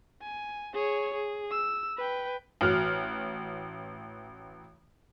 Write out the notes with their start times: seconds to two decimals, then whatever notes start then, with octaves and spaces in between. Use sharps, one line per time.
0.22 G#5
0.74 G#4 C#5
1.14 G#4
1.51 E6
1.97 B4 G5
2.61 A1 F#4 F6